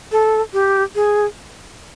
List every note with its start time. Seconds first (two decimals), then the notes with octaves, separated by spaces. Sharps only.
0.12 A4
0.53 G4
0.95 G#4